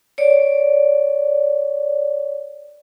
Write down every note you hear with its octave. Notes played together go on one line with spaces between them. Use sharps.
C#5 D5